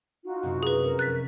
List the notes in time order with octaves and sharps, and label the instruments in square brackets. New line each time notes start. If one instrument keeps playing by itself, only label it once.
[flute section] D#4 F4 F#4
[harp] F#2 C3
[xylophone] G#4 B4
[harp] F1 F#4 [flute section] A#4
[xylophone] F#6 A6 B6